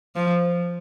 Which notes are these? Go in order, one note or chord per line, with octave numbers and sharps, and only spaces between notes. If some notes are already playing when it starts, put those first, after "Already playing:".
F3